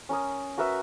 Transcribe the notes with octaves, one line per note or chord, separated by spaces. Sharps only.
C#4 A#4 D#6
F#4 A#4 B4 E5